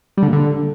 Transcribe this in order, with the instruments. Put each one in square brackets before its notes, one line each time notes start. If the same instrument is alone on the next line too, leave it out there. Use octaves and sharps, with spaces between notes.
[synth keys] G3
D3
A#2
D3